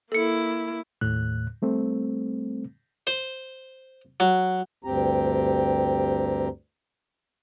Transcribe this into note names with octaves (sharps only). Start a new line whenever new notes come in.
A#3 E4 A4 C#7
D#2 A2 F#6
G3 A3 C4
C5
F#3
D2 G2 C4 G4 A#5